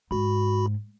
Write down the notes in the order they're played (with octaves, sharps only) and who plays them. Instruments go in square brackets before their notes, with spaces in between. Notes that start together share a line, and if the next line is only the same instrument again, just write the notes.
[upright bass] G#2 [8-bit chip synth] F#4 B5